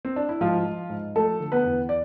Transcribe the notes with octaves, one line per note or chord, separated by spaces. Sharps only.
C4
D4
E4
G#2 F3 F4
F3
G#2
F3 A3 A4
D3
B3 B4
E2
D5